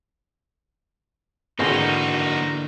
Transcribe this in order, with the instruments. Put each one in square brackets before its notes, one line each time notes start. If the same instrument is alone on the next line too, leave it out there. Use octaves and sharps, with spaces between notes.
[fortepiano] G#1 G#4 [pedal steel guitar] D3 E3 B4 [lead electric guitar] A#3 F#4 [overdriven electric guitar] D#4